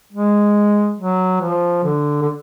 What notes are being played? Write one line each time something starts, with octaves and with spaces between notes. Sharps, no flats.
G#3
F#3
F3
D3
D3